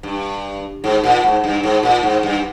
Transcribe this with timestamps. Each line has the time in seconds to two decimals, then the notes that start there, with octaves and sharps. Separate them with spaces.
0.03 G2
0.84 G#2
1.04 A#2
1.23 G#2
1.44 G2
1.63 G#2
1.83 A#2
2.03 G#2
2.23 G2